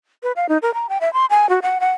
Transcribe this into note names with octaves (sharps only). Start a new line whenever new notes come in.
B4
F5
D#4
A#4
A#5
G5
E5
C6
G#5
F#4
F#5
F#5